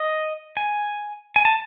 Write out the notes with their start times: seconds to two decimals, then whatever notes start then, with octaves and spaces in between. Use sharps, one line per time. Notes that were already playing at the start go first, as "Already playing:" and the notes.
Already playing: D#5
0.57 G#5
1.36 G#5
1.45 A5